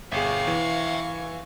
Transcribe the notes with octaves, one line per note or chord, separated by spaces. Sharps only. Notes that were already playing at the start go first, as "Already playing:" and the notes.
G1 G#4 E5 F5 G5 C#6
E3